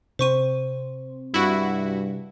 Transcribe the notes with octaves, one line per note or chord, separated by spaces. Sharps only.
C3 C4 C5 C#6 D#7
G2 E4 F#4